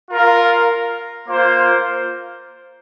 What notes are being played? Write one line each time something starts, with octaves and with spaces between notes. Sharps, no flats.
F4 A#4 F5
A#3 F4 C5